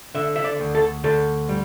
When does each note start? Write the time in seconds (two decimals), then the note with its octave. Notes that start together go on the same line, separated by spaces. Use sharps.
0.15 D3 E5
0.36 E5
0.44 D5
0.60 D2
0.75 A4
1.04 D2 A4
1.49 G3